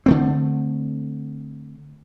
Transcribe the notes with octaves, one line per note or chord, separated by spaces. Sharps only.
D3 A3 C4